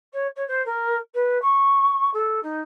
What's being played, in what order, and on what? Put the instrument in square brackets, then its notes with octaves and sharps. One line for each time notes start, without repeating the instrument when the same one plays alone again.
[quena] C#5
C#5
C5
A#4
B4
C#6
A4
D#4